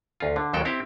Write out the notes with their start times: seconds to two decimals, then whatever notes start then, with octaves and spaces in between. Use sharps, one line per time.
0.20 D2 F4
0.36 D3
0.53 D#2 F#3 G#3 A4 G5
0.65 C4 E4 G4